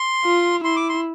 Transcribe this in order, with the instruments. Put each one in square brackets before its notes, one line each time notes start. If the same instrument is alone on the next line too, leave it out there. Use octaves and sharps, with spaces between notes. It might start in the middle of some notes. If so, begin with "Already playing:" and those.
Already playing: [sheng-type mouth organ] C6
[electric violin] F4
[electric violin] E4 [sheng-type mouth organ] C6
[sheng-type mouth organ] D6
C6